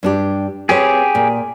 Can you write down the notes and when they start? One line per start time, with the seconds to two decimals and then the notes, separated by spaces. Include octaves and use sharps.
0.03 G2 D4 G4
0.69 C4 G4 G#4 B4 C#5
1.15 A#2